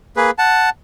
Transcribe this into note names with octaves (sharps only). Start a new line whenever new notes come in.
A#3 G#4 B4
F#5 A5